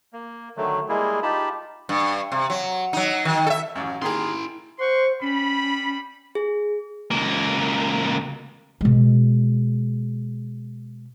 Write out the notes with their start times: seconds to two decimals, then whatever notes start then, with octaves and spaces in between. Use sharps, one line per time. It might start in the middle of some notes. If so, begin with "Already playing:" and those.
0.13 A#3
0.57 D3 D#3 F#3 A3
0.89 G3 G#3 A#3 E4 G#4
1.23 D#4 F4 G4 A5 B5
1.89 G2
2.32 C3
2.50 F#3
2.93 F#3 D#4
3.25 D#3
3.46 A4 E5
3.75 A1 F#2
4.02 D#3 A#3 E4 G#4 C6
4.79 C5 F#5 C6 C#6
5.22 G3 C#4 B5
6.35 G#4
7.11 C#2 A#3
8.81 B2 G#3